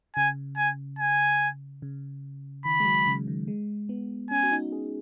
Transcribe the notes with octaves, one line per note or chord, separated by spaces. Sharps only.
C#3 G#5
G#5
G#5
C#3
D#3 B5
G#3
F#3
C#3
D#3
G#3
B3
C#4 G#5
F#4
D#4
G#4